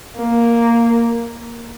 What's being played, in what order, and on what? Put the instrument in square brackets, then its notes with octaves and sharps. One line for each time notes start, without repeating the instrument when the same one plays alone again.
[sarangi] A#3